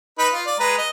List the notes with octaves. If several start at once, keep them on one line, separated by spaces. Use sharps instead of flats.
D#4 B4 B5
F4
D5
G#3 B4 A#5
D#5